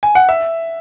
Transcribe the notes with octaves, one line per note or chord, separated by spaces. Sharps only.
G#5
F#5
E5